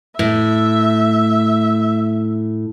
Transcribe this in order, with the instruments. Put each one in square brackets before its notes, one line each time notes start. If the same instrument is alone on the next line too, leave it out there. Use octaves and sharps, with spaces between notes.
[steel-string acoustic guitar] A2 [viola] E5